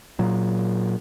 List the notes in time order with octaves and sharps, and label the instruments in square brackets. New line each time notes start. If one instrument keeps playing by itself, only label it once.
[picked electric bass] A#2 F#3